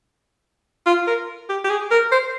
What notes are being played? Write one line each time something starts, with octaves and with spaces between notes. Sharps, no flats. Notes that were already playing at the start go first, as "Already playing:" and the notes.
F4
A#4
G4
G4
G#4
A#4
C5